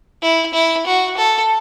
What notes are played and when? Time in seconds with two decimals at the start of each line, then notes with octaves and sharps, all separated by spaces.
0.23 E4
0.54 E4
0.86 F#4
1.17 A4